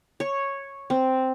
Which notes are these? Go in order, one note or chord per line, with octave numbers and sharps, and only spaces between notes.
C#5
C4